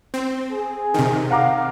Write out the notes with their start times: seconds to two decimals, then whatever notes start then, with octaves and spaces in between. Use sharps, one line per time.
0.14 C4
0.51 G#4
0.94 C3 D#3
1.31 F5 F#5 A#5 D6